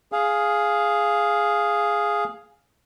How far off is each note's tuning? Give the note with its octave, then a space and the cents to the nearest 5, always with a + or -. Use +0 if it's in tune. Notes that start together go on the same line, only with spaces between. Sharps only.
G#4 +0 F5 +0